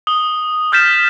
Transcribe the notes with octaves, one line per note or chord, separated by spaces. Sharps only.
D#6 G7
D#6 F6 G6 A6 B6 E7